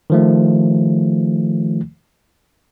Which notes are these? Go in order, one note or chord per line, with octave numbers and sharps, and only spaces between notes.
D#3 F3 A3